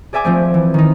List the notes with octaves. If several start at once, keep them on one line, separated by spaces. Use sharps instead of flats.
G#4 D5 E5 G#5 D6
F3 A3 C4
E3
D#3 D#4